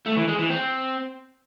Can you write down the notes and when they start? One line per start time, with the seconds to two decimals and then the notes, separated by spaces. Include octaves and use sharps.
0.06 A3
0.17 E3
0.28 G#3
0.39 E3
0.50 C4